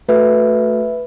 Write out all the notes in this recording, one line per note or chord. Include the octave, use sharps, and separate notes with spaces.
A3 F#4 A4 B4 E5